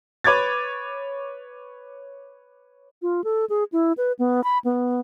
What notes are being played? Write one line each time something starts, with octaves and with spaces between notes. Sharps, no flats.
B4 C#5 D6 G#6 A6
F4
A4
G#4
E4
B4
B3
B5
B3